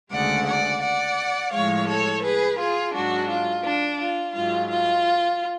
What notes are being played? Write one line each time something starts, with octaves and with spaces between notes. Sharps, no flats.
D2 C#3 G#3 D5 F#5
D5 F#5
D5 F#5
A2 F3 G#3 C#5 F5
A4 C#5
G#4 B4
F4 G#4
G#2 F#3 D4 F#4
F4
D4
F4
G#2 F#3 F4
F4